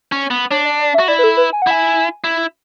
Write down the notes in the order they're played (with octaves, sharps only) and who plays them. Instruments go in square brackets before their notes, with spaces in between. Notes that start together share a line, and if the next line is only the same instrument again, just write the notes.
[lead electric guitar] C#4
B3
[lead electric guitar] D4 [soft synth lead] C#5
[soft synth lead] D5
D5
E5
[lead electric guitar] F#4
[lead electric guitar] E4 [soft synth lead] D5
[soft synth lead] B4
A4
B4
G#5
F#5
[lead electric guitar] E4 [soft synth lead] G#5
[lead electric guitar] E4